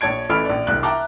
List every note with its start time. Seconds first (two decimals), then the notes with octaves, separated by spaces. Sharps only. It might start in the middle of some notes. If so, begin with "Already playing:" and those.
0.01 A#1 C#5 A5 G#6 D7
0.29 A1 E3 A4 B5 F6 D7
0.46 A#1 D5
0.67 E1 C2 F#6
0.83 E5 G5 A5 A#5 D6